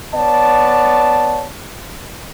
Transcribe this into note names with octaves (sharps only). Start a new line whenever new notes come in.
B3 C#5 D5 A5